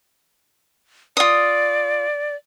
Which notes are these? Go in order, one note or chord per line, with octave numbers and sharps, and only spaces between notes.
F4 D5 D#6